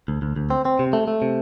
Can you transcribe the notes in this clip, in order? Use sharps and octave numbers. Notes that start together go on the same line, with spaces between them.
D2
D2
D2
C4
C4
C3
A3
A3
C3